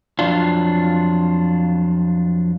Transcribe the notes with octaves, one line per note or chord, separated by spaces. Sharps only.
F2 F#3 D4 F4